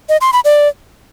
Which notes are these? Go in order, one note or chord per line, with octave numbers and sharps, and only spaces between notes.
D#5
C6
B5
D5